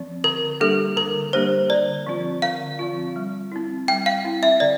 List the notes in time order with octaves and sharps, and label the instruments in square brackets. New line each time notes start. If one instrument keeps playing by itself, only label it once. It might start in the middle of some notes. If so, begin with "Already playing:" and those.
Already playing: [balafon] F3 C4
[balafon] D3 [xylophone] A#4
[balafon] G3 A#3 D4 G4 [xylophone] A4
[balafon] D3 [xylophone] A#4
[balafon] G3 A#3 D4 G4 [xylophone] C5
[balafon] D3 [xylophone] D5
[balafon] F3 C4 F4
[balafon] D3 [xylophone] F5
[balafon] F3 C4 F4
G3
C4 E4
[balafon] G3 [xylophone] G5
[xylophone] F5
[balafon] C4 E4
[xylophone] E5
[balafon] D3 [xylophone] D5